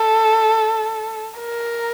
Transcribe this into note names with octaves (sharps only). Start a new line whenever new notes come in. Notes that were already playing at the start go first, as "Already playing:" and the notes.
Already playing: A4
A#4